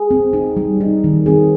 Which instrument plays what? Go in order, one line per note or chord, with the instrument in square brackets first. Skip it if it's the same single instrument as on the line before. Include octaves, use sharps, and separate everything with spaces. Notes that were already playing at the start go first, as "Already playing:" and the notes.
Already playing: [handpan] G#4
C4
D#4
G3
D#4
D#3
C4 G#4